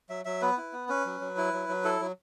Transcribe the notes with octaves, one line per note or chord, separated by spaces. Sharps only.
F#3 E5
F#3 E5
B3 B4
E4
B3
C#4 B4
F#3
F#3
E4
F#3
F#3
E4 A4
F#3